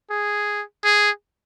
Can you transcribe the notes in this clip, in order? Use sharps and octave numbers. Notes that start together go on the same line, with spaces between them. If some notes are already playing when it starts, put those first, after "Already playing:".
G#4
G#4